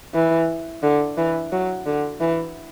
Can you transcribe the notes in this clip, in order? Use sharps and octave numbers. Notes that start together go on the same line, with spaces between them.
E3
D3
E3
F#3
D3
E3